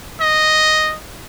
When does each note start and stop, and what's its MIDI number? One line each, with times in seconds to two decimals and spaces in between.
0.21 0.95 75